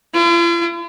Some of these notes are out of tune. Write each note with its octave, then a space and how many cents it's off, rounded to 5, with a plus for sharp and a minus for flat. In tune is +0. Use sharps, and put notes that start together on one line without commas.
F4 -45